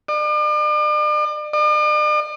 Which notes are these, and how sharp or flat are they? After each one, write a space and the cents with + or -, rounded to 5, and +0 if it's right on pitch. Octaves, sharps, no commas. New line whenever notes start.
D5 +40
D5 +45